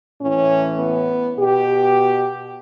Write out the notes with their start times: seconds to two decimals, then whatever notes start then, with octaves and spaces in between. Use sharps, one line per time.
0.21 A2 E3 C#4
0.80 B3
1.38 B2 G4